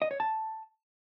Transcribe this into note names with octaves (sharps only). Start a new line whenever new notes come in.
D#5
C#5
A5